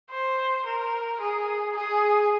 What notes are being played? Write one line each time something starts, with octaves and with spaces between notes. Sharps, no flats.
C5
A#4
G#4
G#4